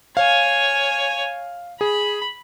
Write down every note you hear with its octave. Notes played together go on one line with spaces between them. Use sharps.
C#5 F5 G#5
G#4 B5